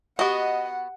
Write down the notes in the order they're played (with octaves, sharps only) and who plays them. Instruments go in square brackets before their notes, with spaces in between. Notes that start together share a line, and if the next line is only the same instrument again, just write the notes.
[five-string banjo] B3 F#4 [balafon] G4 C#6 [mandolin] D#5 [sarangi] F#5